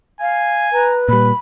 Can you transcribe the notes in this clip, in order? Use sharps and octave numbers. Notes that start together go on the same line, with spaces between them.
F5 G#5
B4 A#5
A#2 G3 B5